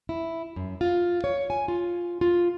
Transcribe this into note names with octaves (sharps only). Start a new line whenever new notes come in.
E4
F#2
F4
C#5
G#5
F4
F4